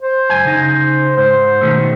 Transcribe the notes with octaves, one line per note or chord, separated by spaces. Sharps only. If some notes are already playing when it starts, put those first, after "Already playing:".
C5
C#2 F#2 G#5
C#3 D#4
G#2 C5
B2 D#3 A3